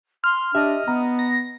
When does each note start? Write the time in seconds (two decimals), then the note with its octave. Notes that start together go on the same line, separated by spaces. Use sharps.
0.24 C6 F6
0.55 D4 G4 D#5 E5
0.88 B3 A#5
1.19 A#6